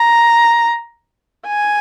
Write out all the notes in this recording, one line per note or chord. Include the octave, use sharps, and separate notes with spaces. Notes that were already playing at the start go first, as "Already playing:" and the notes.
Already playing: A#5
G#5